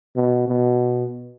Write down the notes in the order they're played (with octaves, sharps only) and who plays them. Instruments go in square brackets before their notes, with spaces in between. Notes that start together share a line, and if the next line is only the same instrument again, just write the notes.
[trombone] B2
B2